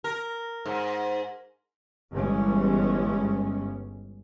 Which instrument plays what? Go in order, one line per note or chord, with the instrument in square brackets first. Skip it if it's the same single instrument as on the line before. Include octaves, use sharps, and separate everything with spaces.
[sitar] A#4
G#2
[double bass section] G1 G2 E3 G#3 C#4